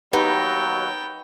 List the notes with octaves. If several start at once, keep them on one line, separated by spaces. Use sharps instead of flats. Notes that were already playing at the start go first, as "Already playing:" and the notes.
D#2 F#3 B3 D#4 G4 B4 F#5 G5